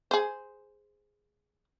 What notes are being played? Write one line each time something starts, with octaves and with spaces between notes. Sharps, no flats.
G#4 C5